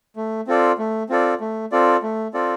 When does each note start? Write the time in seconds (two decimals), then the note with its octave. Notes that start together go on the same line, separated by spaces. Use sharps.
0.16 A3
0.47 C4 F4 A4 D5
0.78 A3
1.09 C4 F4 A4 D5
1.40 A3
1.72 C4 F4 A4 D5
2.03 A3
2.34 C4 F4 A4 D5